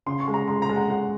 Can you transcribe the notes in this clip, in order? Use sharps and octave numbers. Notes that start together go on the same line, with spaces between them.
C#3 C6
C#6
G#3
A#5
G#3 C6
A#5
G#3
F#5
G#3 F#5